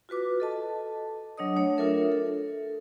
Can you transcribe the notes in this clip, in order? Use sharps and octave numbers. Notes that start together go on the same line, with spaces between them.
F4 F#4 B4 D6
A4 D#5 A5
F#3 D4 C#5 D#5 D#6
A3 D4 C#5
D4 F4 A4 A#4 E5
A4